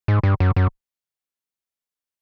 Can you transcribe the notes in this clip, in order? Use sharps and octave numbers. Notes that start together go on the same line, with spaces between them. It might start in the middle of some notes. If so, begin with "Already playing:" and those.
G#2
G2
F#2
F#2